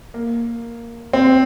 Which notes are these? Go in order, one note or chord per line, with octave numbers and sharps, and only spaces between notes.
A#3
C4